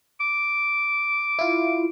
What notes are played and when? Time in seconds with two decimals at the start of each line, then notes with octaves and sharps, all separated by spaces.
0.20 D6
1.39 E4 F4